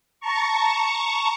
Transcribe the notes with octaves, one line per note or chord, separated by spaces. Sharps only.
A5 A#5 C#6